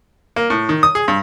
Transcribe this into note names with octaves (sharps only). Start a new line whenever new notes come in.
A#3
A2
D#3
D#6
G#4
G2